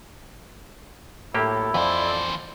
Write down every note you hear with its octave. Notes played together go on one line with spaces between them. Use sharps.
A2 D3 F#3 A#3 E4 G4 A4
F2 E3 F4 A4 C5 D5